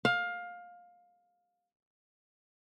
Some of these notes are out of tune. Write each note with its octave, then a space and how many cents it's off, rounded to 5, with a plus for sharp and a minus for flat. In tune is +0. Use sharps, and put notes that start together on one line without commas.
F5 +20